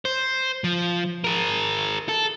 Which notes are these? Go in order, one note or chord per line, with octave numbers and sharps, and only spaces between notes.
C5
F3
G#4 A#4
A4